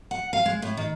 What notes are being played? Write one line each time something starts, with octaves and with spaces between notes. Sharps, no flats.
F#5
F5
G#3
A2
D#3